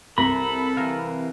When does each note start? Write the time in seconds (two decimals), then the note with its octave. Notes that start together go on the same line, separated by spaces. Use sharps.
0.18 C2 A4 A#4 B5
0.77 E3 A#4 F5